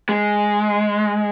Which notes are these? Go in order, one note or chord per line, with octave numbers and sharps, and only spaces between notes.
G#3